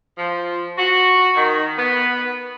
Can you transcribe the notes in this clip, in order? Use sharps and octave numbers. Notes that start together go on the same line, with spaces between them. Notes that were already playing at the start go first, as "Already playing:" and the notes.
F3
F#4
D#3
B3